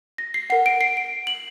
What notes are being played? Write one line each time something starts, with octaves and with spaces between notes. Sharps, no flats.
A#6
C7
A#4 F#5 C7
D7
C7
D7
F#7